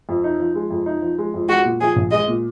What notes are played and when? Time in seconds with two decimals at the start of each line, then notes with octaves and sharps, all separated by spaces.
0.09 F2
0.24 D#4
0.40 F3
0.55 G#3
0.70 F2
0.86 D#4
1.02 F3
1.18 G#3
1.34 F2
1.49 G#3 F#4
1.65 A#2
1.80 F3 G#4
1.96 A#1
2.11 G#3 D#5
2.28 A#2